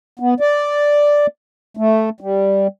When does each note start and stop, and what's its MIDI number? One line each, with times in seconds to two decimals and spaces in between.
0.19 0.34 59
0.40 1.26 74
1.77 2.10 57
2.20 2.67 55